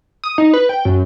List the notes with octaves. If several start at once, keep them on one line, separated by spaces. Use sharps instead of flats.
D#6
D#4
B4
G5
F#2